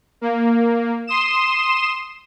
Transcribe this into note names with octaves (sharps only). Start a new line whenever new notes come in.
A#3
C6 D#6 E7